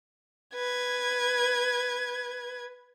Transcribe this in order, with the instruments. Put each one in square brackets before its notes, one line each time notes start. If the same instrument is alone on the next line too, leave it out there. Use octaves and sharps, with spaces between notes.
[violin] B4 G#6